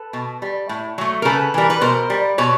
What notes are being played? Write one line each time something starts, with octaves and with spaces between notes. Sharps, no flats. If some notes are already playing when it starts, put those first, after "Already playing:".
Already playing: A4 B4
B2
G3
A2
F#3 A3
A#4
C#3 A4 B4
E3 G3 A#4
B4
B2 A#4 C5
G3
B2 B4 C#5